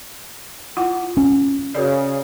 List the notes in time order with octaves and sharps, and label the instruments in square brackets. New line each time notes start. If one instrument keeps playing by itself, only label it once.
[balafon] E4 F4 F#5
[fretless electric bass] C#4
[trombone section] C#3 [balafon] F#4 A#4 D5